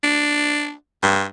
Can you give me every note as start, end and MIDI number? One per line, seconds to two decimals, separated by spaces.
0.04 0.73 62
1.03 1.25 43